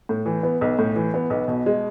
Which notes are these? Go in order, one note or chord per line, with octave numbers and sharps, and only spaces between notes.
A2
E3
B3
B1
A2
E3
B3
B1
B2
G#3